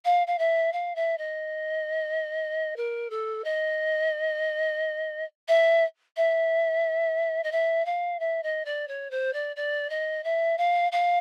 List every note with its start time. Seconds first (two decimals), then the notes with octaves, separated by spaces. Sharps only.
0.05 F5
0.27 F5
0.39 E5
0.73 F5
0.95 E5
1.18 D#5
2.77 A#4
3.10 A4
3.44 D#5
5.48 E5
6.17 E5
7.43 D#5
7.52 E5
7.85 F5
8.20 E5
8.43 D#5
8.65 D5
8.88 C#5
9.11 C5
9.33 D5
9.56 D5
9.90 D#5
10.24 E5
10.58 F5
10.92 F5